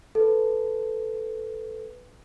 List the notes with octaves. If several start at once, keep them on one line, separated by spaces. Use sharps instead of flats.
A4 B4